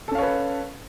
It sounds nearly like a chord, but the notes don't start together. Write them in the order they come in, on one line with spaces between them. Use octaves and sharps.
A4 C#4 F5 C#5 B4